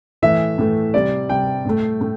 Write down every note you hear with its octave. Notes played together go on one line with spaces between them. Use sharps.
A2 E3 A3 E5
A2 E3 A3
C3 G3 D5
C3 G3 G5
A2 A3
A2 A3